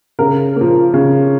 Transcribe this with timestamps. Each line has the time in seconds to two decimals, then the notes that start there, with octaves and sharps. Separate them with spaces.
0.19 C#3 A#4
0.56 F3 A#3
0.94 C#3